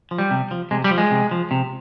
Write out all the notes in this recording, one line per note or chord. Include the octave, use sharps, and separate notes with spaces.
F3
G3
C3
F3
C3 G#3
G3
F3
G#3
C3
F3
C3